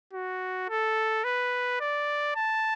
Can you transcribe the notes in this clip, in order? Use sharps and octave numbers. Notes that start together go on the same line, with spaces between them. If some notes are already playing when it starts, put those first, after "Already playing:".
F#4
A4
B4
D5
A5